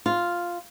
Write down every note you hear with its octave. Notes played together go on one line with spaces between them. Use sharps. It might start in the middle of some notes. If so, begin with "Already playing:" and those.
F4